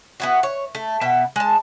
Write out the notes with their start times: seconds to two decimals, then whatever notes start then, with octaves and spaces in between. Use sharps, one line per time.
0.20 B3 E4 F#4
0.43 C#5
0.75 A3
1.01 B2 B3 E5 G5
1.36 G#3 A5